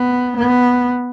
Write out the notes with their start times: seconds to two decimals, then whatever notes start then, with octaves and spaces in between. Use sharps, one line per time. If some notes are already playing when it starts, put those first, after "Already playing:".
Already playing: B3
0.37 B3